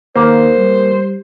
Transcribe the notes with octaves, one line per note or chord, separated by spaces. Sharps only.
D#2 A#3 C5
G3